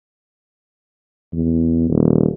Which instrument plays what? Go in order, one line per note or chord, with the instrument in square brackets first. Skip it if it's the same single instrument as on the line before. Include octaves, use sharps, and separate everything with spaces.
[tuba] E2
D#1